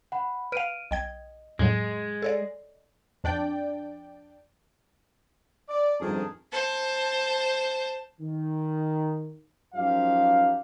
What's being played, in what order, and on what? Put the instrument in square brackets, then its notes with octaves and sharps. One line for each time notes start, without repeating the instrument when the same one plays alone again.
[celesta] F#5 B5
[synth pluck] B4 F5 [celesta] F6 D7 D#7
[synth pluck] B1 G5 G#6 [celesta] D#5
[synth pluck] F2 A2 F#3 [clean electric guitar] G#3
[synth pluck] A4 C#5 D5
[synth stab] F2 D4 D5 G5
[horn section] D5
[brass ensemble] G1 F2 A5 [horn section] G#2 D#3 G#4
[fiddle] C5 A5
[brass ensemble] D#3
F#2 F3 D#4 G4 F5